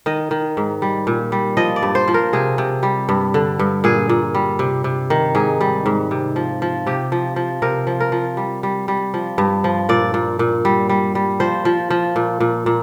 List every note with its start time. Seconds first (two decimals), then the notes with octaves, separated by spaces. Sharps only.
0.06 D#3 D#5
0.31 D#3
0.57 G#2
0.82 G3
1.07 A#2
1.32 G3
1.57 F3 D#5
1.76 D5
1.83 G2
1.95 C5
2.08 F3
2.14 A#4
2.33 C3 G#4
2.58 C3
2.83 G3
3.09 G2
3.34 D3
3.59 G2
3.84 A#2 G#4
4.09 A#2
4.35 G3
4.59 C3
4.84 C3
5.10 D#3
5.35 G#2 G#4
5.61 G3
5.86 G#2
6.11 C3
6.36 F3
6.62 F3
6.87 C3 G4
7.12 F3
7.36 F3
7.62 C3 A#4
7.87 F3
8.00 A#4
8.12 F3
8.37 G3
8.63 G3
8.88 G3
9.14 F3
9.38 G2
9.64 F3
9.89 A#2 D5
10.14 A#2
10.39 A#2
10.65 G3
10.89 G3
11.15 G3
11.40 F3 C5
11.65 F3
11.90 F3
12.16 A#2
12.40 A#2
12.66 A#2